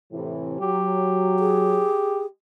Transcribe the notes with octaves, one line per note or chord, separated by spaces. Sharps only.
A2 C3 E3
F#3 G4
G#4